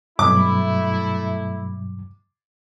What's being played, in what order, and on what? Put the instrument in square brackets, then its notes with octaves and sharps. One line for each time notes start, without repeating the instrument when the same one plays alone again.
[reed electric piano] G2 B2 F#3 [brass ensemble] A3 E4 [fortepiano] D6